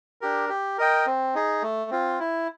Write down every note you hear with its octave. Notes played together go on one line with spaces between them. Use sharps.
D4 G4 A#4
G4
A#4 D#5 G5
C4
D#4 G#4
A3
C4 F4
E4